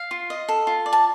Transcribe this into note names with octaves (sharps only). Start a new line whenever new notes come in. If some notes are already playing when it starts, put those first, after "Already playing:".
Already playing: F5
F4
D#5
A4
F4
D5
A5